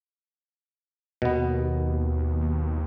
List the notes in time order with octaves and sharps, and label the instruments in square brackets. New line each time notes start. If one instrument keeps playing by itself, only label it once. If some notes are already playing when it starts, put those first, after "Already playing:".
[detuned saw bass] D#2 [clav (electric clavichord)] B2 B3